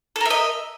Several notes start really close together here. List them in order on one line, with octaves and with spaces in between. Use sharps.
A4 A#4 E5 D#5